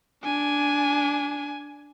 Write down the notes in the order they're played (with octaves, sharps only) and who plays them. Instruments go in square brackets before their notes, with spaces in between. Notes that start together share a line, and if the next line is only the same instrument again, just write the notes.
[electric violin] D4 G#5